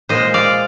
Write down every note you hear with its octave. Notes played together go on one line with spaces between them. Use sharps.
A#2 G#3 C5 D#5
D5 F5